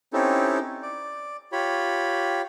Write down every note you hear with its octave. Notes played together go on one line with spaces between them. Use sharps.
C4 C#4 D#4 E4 G4 A4
D5
F4 G4 C#5 B5